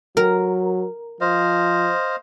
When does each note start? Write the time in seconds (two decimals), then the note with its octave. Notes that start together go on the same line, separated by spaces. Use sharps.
0.17 F#3 A#4
1.21 F3 C5 D#5 F5